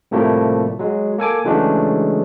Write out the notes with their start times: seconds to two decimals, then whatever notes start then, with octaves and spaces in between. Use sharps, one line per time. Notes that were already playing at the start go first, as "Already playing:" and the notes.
0.11 A2 C3 F3 G3 A3 A#3
0.79 F#3 G#3
1.18 A#3 A4 G#5 D6
1.45 C#3 E3 F#3 G#3 A3 D4